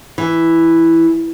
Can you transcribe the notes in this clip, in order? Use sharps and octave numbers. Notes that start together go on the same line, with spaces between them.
E3